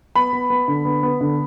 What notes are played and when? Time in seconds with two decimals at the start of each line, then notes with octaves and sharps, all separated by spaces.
0.16 B3 B5
0.33 B3
0.50 B3
0.68 D3
0.85 B3
1.03 B3
1.21 D3